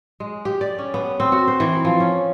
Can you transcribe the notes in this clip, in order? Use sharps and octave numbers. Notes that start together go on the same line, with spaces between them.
G#3
G4
D5
C#4
B3
C4
F#4
C5
E3
F3
C#4